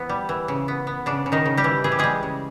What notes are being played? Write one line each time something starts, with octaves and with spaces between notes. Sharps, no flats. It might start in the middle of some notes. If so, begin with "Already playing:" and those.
Already playing: E3 B3
G3
E3
C#3
B3
B3
C#3 D4
C#3
D#3 D#4
C#3
G3 G4
E3
E3 G#4
G4
G3 G#3 G#4
C#3